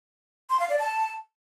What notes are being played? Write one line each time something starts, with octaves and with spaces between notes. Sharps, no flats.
C6
F5
D5
A5